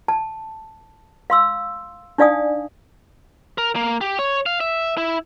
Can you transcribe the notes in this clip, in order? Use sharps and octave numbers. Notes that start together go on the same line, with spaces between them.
A5
F5 C6 E6
D4 D#4 D5 F5 G#5 D#6
A#4
A#3
G4
C#5
F5
E5
E4